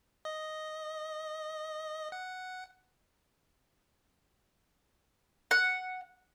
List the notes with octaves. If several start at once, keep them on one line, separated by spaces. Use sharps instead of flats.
D#5
F#5
F#5